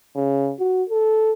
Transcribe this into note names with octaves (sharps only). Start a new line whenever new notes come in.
C#3
F#4
A4